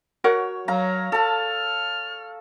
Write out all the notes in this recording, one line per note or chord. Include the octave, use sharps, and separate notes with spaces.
F#4 A#4 C#5 F#5
F#3 F5 A#5
A4 A5 F6